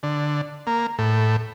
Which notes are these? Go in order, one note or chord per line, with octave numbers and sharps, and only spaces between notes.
D3
A#3
A2